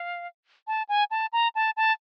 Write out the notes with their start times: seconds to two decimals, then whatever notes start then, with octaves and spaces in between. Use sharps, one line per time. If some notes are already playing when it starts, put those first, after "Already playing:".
Already playing: F5
0.67 A5
0.89 G#5
1.11 A5
1.33 A#5
1.55 A5
1.77 A5